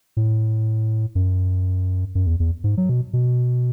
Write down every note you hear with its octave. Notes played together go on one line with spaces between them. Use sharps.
A2
F#2
F#2
E2
E2
G#2
F#3
B2
B2